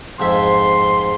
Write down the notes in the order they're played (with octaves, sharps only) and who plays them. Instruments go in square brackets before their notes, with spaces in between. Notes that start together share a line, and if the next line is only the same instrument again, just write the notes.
[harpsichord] F2 G#2 E5 [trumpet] C6